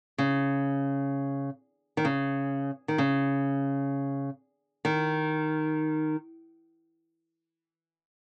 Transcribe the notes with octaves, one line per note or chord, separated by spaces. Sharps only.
C#3
D#3
C#3
D#3
C#3
D#3